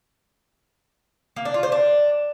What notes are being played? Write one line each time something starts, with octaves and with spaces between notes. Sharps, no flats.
A#3
D4
F4
C5
D4